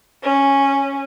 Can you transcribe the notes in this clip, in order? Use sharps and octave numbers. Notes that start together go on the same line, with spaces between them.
C#4